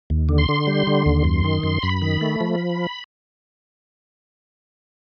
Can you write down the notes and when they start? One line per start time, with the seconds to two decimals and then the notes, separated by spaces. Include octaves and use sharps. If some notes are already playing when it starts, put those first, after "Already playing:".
0.10 D#2
0.29 D3
0.38 C6
0.49 D3
0.67 G3
0.87 D3
1.06 D#2
1.25 F#2
1.44 D#3
1.63 F#2
1.83 F#2 B5
2.02 D#3
2.21 A3
2.41 F3